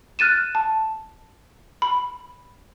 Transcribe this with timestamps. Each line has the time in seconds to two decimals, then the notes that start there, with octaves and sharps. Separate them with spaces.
0.19 F6 F#6 A6 D#7 E7
0.55 A5
1.82 B5